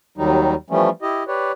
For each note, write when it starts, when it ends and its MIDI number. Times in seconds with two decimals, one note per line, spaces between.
0.18 0.54 39
0.18 0.54 51
0.18 0.54 54
0.18 0.54 55
0.18 0.54 63
0.70 0.89 52
0.70 0.89 53
0.70 0.89 55
0.70 0.89 57
0.70 0.89 61
1.02 1.24 64
1.02 1.24 67
1.02 1.24 75
1.28 1.52 67
1.28 1.52 71
1.28 1.52 73
1.28 1.52 74